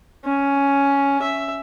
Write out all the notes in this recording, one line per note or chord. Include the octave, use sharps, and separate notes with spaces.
C#4
E5